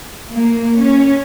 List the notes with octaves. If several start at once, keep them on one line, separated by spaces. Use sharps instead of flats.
A#3
C#4